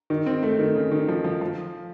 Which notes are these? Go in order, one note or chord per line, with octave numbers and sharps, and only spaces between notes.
D#3
C4
A3
D#3
C#3
D#3
F3
F3
F3